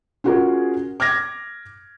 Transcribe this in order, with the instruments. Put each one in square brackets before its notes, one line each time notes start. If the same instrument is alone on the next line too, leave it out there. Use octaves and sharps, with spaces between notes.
[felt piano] C#4 F4 F#4 G#4 A#4
D6 F6 G#6 A#6